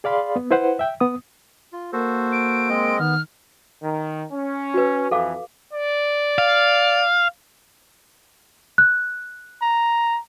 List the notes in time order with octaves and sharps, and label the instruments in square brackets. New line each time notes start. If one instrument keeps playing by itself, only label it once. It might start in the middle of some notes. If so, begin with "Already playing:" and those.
[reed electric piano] G#4 D5 F5 B5 C6
B3
E4 B4 C5 F#5
E5 G5
B3 D#6
[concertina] F4
[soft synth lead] A#3 [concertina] F#4 A4 C5
[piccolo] D7
[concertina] G#3 C4 D#5
[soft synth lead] D#3 [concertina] B3 [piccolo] F6
[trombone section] D#3
C#4
[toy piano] F#4 B4
[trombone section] F2 E3 [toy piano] A4 F5 D6
[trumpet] D5
[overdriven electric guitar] F5
[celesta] F#6
[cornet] A#5